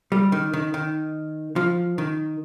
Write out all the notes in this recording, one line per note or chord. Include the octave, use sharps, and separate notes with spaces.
G3
D#3
D#3
D#3
F3
D#3